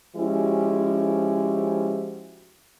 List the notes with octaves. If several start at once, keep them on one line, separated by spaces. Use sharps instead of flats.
F3 G#3 C#4 E4 F#4 G4